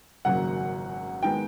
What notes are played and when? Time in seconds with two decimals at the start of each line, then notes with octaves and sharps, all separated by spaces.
0.25 G#1 F#2 C#3 F#3 A#3 F#5
1.23 D#3 G#3 B3 G5